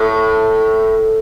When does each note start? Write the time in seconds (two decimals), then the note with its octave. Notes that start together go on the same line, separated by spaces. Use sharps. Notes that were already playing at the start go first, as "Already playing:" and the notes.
Already playing: A2